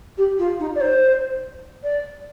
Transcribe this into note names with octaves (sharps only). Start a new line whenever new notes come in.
G4
F4
D#4
D5
C5
D5